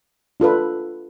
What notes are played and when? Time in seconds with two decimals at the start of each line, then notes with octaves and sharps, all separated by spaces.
0.40 D4 F4 A4 B4